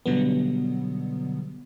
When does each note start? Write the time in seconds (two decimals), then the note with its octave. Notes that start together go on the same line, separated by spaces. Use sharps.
0.06 B2 D3 F#3 G3 B3